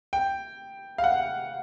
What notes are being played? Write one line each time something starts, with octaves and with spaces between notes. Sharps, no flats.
G5
F5
F#5